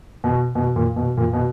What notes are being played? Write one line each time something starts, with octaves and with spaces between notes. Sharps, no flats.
B2
B2
A#2
B2
A#2
B2